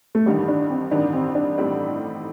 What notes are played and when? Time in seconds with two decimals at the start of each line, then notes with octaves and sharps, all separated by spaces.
0.15 A3
0.26 A1 G2 D#3 G3
0.48 D4
0.70 C4
0.91 A1 G2 D#3 D4
1.13 C4
1.35 D4
1.57 A1 A2 G3 C4 D#4